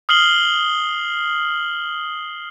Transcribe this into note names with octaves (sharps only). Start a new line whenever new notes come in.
D#6 F6 C7 F#7 G7